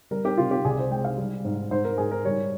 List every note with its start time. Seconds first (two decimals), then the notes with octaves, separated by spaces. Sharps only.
0.11 G3 A#4
0.25 G4
0.38 C3 F4
0.51 G4
0.65 C2 G#4
0.78 C5
0.91 G#3 G5
1.04 F5
1.18 G3
1.45 G#2
1.71 G#2 C5
1.85 A#4
1.98 G#2 G#4
2.11 A#4
2.25 G3 C#5